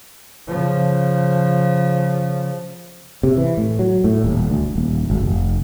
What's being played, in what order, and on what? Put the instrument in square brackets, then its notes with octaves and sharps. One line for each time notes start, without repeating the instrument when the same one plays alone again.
[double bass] C#3 F3
[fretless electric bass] C3
E3
A2
F#3
A2
D#1
D2
D#1
G#1
F1